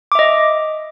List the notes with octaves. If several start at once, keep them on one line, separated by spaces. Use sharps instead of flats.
D#5 E5 D6